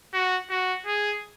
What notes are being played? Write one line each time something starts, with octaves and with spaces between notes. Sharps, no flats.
F#4
F#4
G#4